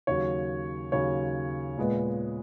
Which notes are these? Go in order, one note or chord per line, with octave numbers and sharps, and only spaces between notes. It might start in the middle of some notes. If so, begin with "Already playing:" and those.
D#2 C#3 F#3 C#5
D#2 C#3 F#3 C#5
A#2 G#3 B3